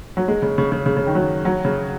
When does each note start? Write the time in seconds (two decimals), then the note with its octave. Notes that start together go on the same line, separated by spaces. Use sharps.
0.17 F#3
0.28 G#3
0.42 C#3
0.58 C#3
0.72 C#3
0.86 C#3
0.97 C#3
1.07 D#3
1.15 F#3
1.45 F#3
1.65 C#3